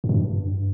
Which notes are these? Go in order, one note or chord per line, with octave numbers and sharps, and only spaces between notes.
G#2
B2
G2